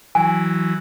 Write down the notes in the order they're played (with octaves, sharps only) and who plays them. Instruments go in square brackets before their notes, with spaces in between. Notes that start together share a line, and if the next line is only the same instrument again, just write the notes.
[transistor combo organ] E3 F#3 [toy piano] G#5